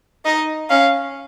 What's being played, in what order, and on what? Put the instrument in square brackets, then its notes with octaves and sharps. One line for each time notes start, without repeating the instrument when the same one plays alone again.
[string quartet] D#4 [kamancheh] D#5
[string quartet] C#4 [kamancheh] F5